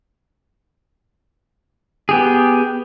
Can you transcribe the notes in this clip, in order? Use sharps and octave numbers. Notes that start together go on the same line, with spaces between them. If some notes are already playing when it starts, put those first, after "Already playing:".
B3 G4 G#4